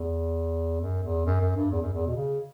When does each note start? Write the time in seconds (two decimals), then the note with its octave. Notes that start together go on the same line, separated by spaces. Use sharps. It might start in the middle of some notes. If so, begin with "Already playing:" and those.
Already playing: E2
0.81 F#2
1.04 E2
1.26 F#2
1.42 F#2
1.56 G2
1.71 E2
1.82 F#2
1.94 E2
2.07 B2
2.16 C#3